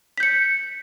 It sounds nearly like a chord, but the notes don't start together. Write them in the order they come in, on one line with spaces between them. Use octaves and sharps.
B6 G6 C#7